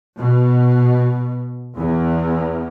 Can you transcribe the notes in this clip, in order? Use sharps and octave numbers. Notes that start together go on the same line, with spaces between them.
B2
E2